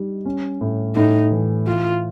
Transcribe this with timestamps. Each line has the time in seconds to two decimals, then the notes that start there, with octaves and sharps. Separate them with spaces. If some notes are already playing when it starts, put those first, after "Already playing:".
Already playing: G3 D#4
0.25 C#4
0.61 A2
0.96 A2 D#4
1.31 E3
1.67 E3 F4